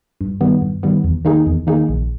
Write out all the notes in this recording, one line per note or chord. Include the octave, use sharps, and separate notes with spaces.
G2
D#3 G3 B3
G2
D#3 G3 B3
E2
D#3 A#3 D#4 G#4
E2
D#3 A#3 D#4 G#4
A#1